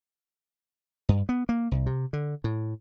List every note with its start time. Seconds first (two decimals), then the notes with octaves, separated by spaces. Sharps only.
1.09 G2
1.29 B3
1.49 A#3
1.71 C2
1.86 C3
2.13 D3
2.44 A2